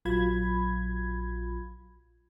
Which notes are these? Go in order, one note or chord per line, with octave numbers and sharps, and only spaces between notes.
A#1 F#3 F4 B5 G#6